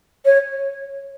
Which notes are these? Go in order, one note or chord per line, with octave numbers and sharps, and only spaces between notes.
C#5